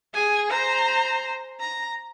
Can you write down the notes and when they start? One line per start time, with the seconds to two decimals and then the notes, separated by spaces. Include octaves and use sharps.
0.14 G#4 G#5
0.51 C5 A#5
1.60 A#5